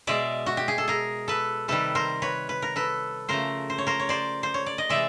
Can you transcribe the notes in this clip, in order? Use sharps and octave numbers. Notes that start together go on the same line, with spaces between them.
B2 G#3 D5 E5
F#4
G4
G#4
A4
G#4 A#4
A4 B4
C3 D#3 G3 A4 B4
A#4 C5
B4 C#5
B4
A#4
A4 B4
C#3 F3 A3 A#4 C5
C5
C#5
A#4 C5
C#5
C5 D5
C5
C#5
D5
D#5
C3 E3 G#3 D5 E5